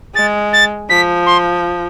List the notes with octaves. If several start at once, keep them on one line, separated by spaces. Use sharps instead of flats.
G#3 A6
A6
F3 B6
C6